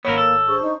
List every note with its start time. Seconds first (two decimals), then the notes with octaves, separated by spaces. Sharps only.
0.05 G#1 A#3 B3 E4 A#4 C#5
0.18 A4
0.48 D4 G#4 C5 C#6
0.62 D#4